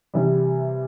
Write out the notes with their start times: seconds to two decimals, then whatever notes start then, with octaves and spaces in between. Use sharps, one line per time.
0.14 C3 E3 G3